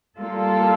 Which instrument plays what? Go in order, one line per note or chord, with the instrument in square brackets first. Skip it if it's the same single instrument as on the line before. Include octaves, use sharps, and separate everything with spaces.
[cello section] G3 A#3 F4 A4